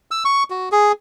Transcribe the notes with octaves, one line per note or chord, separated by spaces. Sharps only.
E6
C#6
F#4
G#4